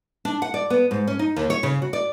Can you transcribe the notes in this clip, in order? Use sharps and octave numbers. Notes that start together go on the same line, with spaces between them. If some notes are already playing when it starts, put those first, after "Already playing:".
D4
F#5
D5
B3
G#2
C#4
D#4
D#2
C#5
C#3
F#4
D5